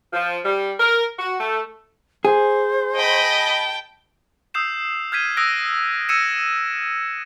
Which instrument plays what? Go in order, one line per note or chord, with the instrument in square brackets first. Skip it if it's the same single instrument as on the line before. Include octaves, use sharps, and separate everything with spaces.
[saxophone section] F3
G3
A#4
F#4
A3
[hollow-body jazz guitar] G#4 [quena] C5
[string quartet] D#5 B5 [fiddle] G5 A5
[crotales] D#6 E6 G6 C7 E7
F6 G6 G#6 B6 D#7
D#6 E6 F#6 A#6 D7
E6 G#6 A#6 C#7 D#7 E7